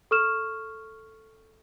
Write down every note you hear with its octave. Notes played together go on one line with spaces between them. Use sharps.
A4 C#6 F6 E7